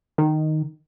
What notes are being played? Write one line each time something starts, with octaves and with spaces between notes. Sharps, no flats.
D#3